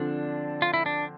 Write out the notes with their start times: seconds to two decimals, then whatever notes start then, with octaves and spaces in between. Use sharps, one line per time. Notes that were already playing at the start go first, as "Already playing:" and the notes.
Already playing: D3 F3 C4 D4
0.62 F4
0.74 E4
0.86 D4